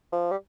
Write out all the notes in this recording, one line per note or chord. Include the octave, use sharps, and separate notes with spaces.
F3
G3